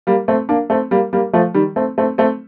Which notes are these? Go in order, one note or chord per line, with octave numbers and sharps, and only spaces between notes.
G3 A#3
A3 C4
A#3 D4
A3 C4
G3 A#3
G3 A#3
F3 A3
D#3 G3
A3 C4
A3 C4
A3 C4